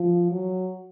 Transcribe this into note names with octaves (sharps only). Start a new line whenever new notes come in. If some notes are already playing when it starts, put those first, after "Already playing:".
Already playing: F3
F#3